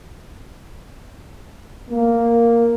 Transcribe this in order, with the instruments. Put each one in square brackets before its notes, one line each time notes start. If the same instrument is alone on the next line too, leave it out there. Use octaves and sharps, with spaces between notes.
[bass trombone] A#3